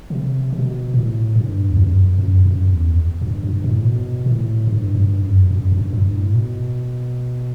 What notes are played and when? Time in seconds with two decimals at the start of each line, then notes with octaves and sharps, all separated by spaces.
0.10 C3
0.53 B2
0.94 A2
1.35 G2
1.70 E2
1.77 F#2
2.18 F#2
2.46 F#2
2.73 E2
3.21 G2
3.43 G2
3.64 A2
3.84 B2
4.26 A2
4.67 G2
4.95 G2
5.22 F#2
5.51 F#2
5.72 G2
5.92 G2
6.12 A2
6.33 B2